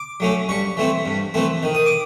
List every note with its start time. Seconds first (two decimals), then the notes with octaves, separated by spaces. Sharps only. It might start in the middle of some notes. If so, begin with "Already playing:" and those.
Already playing: D6
0.20 F#3 A3 C#4
0.49 G2 C#6
0.77 E3 A3 C4
1.06 G2
1.34 E3 A3 C4
1.63 D#3
1.75 D#6
1.86 D6